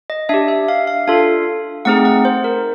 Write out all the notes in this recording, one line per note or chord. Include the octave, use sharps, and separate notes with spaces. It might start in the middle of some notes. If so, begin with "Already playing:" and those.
D#5
D4 G4 E5
E5
F5
F5
D4 F4 A4 F5
A3 C4 D#4 G#4 F#5
F#5
C5
A#4